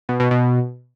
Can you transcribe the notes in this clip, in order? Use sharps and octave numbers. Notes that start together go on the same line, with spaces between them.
B2
B2
B2